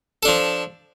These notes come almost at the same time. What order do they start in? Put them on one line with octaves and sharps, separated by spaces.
A4 D4 F3